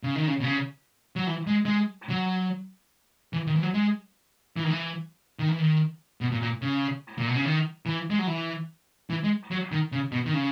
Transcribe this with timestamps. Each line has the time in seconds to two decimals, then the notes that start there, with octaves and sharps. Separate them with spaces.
0.03 C#3
0.16 D#3
0.28 C#3
0.40 B2
0.44 C#3
1.16 F#3
1.27 E3
1.47 G#3
1.65 G#3
2.09 F#3
3.33 E3
3.47 D#3
3.56 E3
3.61 F#3
3.74 G#3
4.57 E3
4.64 D#3
4.70 E3
5.39 D#3
5.49 E3
5.59 D#3
6.21 B2
6.31 A#2
6.42 A#2
6.62 C#3
7.18 A#2
7.27 B2
7.36 C#3
7.45 D#3
7.86 E3
8.10 G#3
8.19 F#3
8.27 E3
9.10 E3
9.24 G#3
9.51 F#3
9.72 D#3
9.92 C#3
10.12 B2
10.26 D#3
10.34 C#3